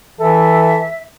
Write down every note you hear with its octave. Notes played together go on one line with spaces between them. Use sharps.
E3 A4 E5